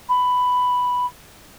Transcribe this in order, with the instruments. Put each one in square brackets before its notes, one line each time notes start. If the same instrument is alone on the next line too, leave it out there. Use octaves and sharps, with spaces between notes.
[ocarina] B5